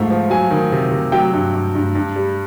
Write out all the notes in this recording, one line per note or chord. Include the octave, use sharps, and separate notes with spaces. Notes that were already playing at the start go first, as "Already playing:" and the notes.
Already playing: G#2 F3 A3
F3
F#3 G#5
D#3
C3
C3
F#3 G5
G2
G2
G2
G2
G3